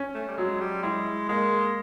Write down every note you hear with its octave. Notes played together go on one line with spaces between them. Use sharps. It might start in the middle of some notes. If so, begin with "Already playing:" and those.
Already playing: C#4
A3
G3
F#3 G#3
G3
G#3 E4
G#3 A#3